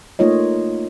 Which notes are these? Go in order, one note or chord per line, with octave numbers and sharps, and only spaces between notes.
A3 A#3 D#4 F4 C#5 D#5